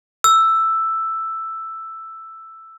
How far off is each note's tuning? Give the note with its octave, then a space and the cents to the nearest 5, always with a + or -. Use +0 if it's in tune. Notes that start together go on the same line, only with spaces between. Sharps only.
E6 +5